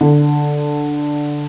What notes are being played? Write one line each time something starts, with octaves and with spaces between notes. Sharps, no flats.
D3